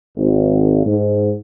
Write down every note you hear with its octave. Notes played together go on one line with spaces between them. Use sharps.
G#1
G#2